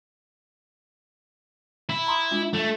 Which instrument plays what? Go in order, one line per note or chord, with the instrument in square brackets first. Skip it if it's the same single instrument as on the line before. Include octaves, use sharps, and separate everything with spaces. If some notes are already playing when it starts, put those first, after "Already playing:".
[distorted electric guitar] E4
[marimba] A#5 C6 D#6
G#3 D4 F4
[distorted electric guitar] A3